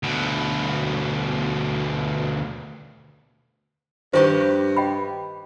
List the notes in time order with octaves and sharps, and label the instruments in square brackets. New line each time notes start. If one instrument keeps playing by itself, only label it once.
[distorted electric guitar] D2 B2
[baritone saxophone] G2 [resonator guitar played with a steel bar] D#3 G4 B4 [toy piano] C5 C#6
[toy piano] D#5 G5 B5